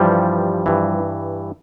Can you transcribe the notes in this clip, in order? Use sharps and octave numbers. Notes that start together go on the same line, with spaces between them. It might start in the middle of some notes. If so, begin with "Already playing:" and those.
Already playing: G2 E3 F3 G3
G2 E3